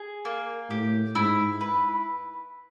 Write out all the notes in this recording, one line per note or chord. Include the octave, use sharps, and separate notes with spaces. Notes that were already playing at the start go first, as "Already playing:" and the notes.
Already playing: G#4
A#3
A2 G4
G#2 E4
B4